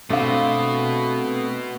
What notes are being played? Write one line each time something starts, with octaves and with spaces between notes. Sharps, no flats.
B2 A3 C4 D4 F5